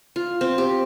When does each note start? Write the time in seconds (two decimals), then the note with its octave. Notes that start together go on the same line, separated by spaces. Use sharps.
0.16 F4
0.41 C4
0.58 G4